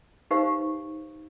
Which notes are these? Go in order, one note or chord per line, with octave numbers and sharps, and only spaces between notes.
D#4 G4 B4 C5 F5 C#6